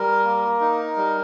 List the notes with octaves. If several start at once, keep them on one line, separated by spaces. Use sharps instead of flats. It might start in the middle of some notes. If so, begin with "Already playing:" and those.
Already playing: G3 A#4
A#3
D#4
G3